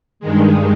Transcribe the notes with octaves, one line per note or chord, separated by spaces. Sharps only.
G2 D#3 G#3